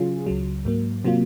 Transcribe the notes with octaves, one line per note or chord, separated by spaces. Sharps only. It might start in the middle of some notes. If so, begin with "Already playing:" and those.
Already playing: C#3 F#3 C#4 F4 G#4
C#2 C#3 F#3
G#2 F#3 A#3
C3 F#3 A#3 F4